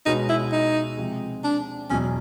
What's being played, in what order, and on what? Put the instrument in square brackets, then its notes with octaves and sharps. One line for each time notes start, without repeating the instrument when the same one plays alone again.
[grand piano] B2 G#3 C#4 F#4 B4 [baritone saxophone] D#4
[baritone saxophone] E4
D#4
[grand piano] C3 F3 G#3
[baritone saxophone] D4
[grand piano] E2 B2 F#3 [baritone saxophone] C#4